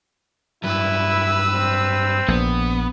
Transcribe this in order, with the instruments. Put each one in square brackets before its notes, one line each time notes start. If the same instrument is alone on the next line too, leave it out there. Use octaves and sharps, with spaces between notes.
[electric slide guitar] G2 F#3 [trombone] E4 [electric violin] B4 E6
[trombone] C4
[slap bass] A#1 [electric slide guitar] B3